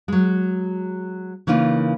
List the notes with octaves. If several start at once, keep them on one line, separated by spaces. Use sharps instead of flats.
F#3 G#3
C#3 E3 A#3 D#4 F4